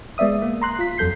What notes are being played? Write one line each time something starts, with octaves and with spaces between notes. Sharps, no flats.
G#3 B3 D5 E5 D#6
A#3
A#5 C6 F#6
F4 B6
F2 F#3 A4 G6 C7